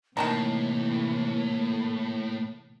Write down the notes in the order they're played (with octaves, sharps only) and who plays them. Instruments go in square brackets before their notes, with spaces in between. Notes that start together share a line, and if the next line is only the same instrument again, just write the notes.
[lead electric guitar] A2 [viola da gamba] C3 E3 [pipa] D#3 A5 A#5 [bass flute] A#3